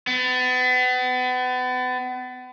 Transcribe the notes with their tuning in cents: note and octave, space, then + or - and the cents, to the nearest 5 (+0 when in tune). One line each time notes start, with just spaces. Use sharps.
B3 +35